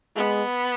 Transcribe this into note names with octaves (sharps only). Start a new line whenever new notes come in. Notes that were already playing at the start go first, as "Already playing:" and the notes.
G#3 B3